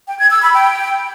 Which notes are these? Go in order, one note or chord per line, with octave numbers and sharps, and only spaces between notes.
G5
G#6
E6
B5
G5